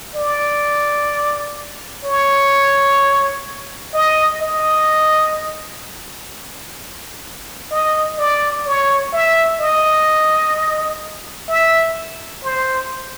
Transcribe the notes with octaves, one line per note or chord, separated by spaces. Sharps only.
D5
C#5
D#5
D#5
D#5
D5
C#5
E5
D#5
E5
C5